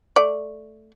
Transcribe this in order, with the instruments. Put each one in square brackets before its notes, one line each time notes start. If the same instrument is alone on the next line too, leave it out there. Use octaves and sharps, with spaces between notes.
[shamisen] A3 D5